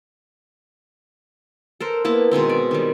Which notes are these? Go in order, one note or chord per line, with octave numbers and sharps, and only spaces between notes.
A4 A#4 C5
A#3 B3 E4 A5
B2 D#3 G#3 C4
D5
D#3 G3